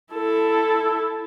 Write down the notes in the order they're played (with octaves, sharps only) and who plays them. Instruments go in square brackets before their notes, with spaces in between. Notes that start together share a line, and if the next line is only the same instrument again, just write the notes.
[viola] E4 A4